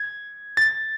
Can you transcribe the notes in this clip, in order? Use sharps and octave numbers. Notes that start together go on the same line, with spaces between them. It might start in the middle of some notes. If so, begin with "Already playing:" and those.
Already playing: G#6
A6